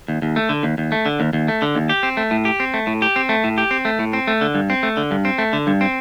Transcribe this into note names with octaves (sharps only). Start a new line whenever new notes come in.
D#2
D#2
A3
D3
D#2
D#2
A3
D3
D#2
D#2
A3
D3
D#2
G4
C4
A3
A2
G4
C4
A3
A2
G4
C4
A3
A2
G4
C4
A3
A2
C4
A3
D3
G2
C4
A3
D3
G2
C4
A3
D3
G2
C4